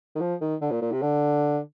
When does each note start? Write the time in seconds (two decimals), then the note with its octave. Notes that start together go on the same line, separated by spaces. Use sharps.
0.15 D#3
0.20 F3
0.41 D#3
0.61 D3
0.71 A#2
0.82 A#2
0.92 C3
1.02 D3